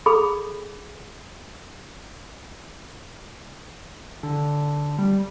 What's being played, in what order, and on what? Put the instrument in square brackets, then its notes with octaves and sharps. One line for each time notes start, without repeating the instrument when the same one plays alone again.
[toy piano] G#4 A4 B5
[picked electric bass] D3
G3